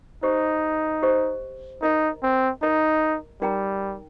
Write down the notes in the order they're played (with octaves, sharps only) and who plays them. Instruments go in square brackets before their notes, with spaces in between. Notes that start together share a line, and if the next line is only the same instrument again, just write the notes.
[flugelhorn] D#4 [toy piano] G4 C5 D#5
[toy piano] G4 C5 D#5
[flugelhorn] D#4 [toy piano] A#4 D#5 A#5
[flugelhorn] C4
[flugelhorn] D#4 [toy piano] A#4 D#5 A#5
[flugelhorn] G3 [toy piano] D#4 A#4 G5 A#5